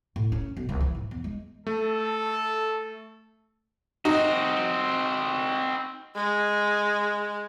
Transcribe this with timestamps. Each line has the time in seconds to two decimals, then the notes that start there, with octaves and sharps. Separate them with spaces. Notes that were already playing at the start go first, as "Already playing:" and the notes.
0.16 A2
0.32 C#4
0.57 B1
0.69 C2
0.81 E3
0.95 G#2
1.11 E2
1.24 G#3
1.67 A3 A4
4.05 C4 D#4 F#4
6.15 G#3